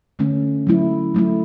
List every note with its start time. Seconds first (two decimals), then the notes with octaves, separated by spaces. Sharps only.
0.19 D3 A3 C#4
0.67 F#3 A3 E4
1.14 F#3 A3 E4